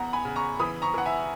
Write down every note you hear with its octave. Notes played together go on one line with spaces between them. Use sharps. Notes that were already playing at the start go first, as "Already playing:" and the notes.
Already playing: E2 F#5 A#5
G#5 B5
C#3
A#5 C#6
E3 B5 D#6
A#5 C#6
E3 F#5
E5 G#5